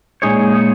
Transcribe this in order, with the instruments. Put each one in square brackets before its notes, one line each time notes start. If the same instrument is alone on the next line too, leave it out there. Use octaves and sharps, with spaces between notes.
[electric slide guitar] A#2 G#3 D#4 G#4 C#5